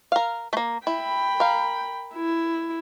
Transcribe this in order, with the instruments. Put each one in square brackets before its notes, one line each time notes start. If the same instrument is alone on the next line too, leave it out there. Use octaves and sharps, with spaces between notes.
[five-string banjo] A#4 F5
A3 A#3
[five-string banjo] E4 [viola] G5 B5
[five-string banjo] A#4 F5
[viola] E4